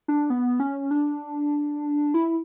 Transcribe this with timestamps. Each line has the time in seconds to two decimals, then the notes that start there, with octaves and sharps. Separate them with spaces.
0.08 D4
0.30 B3
0.60 C#4
0.91 D4
2.14 E4